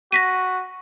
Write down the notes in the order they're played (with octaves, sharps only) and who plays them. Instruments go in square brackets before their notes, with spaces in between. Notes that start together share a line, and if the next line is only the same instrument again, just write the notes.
[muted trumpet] F#4 [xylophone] A#6 B6 D#7